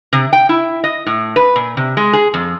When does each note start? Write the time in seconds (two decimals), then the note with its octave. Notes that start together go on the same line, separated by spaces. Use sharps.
0.13 C3
0.33 G5
0.49 E4
0.84 D#5
1.06 A2
1.36 B4
1.56 A#2
1.77 C3
1.97 G#3
2.13 G#4
2.34 F2